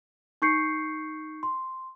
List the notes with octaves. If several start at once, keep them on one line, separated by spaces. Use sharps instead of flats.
D#4 C#6 G6 C7 C#7
C6